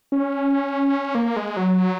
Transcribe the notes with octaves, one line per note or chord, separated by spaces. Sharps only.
C#4
A#3
G#3
F#3